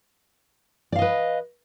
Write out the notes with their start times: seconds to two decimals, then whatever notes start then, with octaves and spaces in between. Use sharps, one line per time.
0.92 D5
0.96 F5
0.99 D#5
1.02 B4